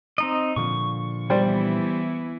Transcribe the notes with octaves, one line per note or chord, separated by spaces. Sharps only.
C4 D#4 D#5
A#2 D3 F3 C#6
E3 G3 B3 E4 C5 D5